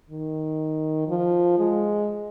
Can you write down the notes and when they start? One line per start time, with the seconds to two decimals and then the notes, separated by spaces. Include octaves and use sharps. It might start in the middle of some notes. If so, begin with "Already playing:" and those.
0.10 D#3
1.08 F3
1.58 G#3